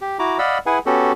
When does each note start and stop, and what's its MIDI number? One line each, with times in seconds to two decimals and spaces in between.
0.01 0.18 67
0.19 0.38 64
0.19 0.38 66
0.19 0.38 82
0.19 0.38 86
0.39 0.58 74
0.39 0.58 75
0.39 0.58 77
0.39 0.58 78
0.39 0.58 83
0.39 0.58 88
0.66 0.79 64
0.66 0.79 68
0.66 0.79 71
0.66 0.79 78
0.66 0.79 80
0.86 1.12 59
0.86 1.12 61
0.86 1.12 66
0.86 1.12 67
0.86 1.12 69